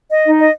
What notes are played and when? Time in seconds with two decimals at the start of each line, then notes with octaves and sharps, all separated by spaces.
0.10 D#5
0.25 D#4
0.39 D#5